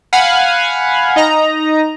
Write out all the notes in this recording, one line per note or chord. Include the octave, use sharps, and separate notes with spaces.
F5 F#5 G#5 B5
D#4 D#5 A#5